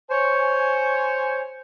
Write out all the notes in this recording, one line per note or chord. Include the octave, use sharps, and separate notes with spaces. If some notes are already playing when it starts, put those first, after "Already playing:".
C5 C#5 G#5